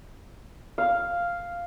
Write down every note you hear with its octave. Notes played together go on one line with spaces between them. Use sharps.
F5